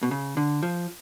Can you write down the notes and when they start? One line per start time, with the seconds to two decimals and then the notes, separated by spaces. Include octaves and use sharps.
0.03 B2
0.11 C#3
0.37 D3
0.63 F3